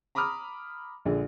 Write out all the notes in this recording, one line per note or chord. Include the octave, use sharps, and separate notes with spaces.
A#5 B5 D6 D#6 F6
A#1 D3 G#4